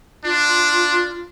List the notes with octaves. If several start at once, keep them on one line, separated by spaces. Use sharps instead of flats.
D4 F4